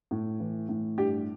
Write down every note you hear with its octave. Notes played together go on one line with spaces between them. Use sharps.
A2
E3
A2
G2 G4